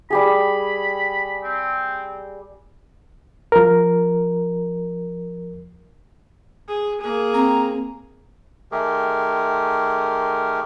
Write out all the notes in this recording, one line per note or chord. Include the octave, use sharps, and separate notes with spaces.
G3 G4 G#4 B5
C4
F3 A#4
G#4
A#3 G#4
C4 A#5
D#3 A3 G4 G#4 A#4